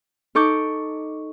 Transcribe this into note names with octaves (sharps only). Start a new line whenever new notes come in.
D#4 A4 C#6 D6 G6